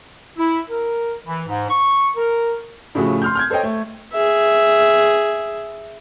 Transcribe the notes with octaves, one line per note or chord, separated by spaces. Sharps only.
E4
A#4
E3
G#2
C#6
A#4
A2 C#3 F3 A3 F#4 G#4
C6 F6 G6
F6 G6 G#6
A4 C5 C#5 D#5 G5
A3
G#4 E5